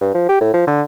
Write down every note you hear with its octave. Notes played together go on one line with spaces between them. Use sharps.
G2
F3
G4
A2
F3
D3